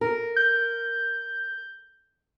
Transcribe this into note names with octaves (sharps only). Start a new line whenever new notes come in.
A#4
G6